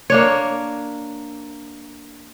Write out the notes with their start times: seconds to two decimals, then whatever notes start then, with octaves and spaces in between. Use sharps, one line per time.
0.10 A#3 D4 C#5